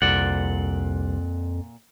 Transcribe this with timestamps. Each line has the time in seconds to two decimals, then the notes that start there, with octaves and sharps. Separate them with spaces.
0.02 C2 F2 A#2 D5 F#5